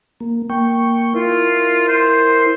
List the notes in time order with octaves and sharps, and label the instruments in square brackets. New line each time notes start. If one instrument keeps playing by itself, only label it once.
[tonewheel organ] A#3
A#3 G5 C#6
[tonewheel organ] E4 A#4 [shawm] F4
[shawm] C5